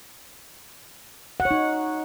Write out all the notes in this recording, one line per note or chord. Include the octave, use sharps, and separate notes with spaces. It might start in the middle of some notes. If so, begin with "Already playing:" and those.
F#5
C#5
D#4